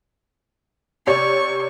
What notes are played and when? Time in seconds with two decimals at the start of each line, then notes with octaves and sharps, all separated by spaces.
1.07 C3 C#5 D5 C#6